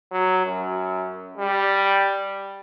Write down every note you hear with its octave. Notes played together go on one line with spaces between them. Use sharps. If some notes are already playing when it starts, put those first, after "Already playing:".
F#3
F#2
G3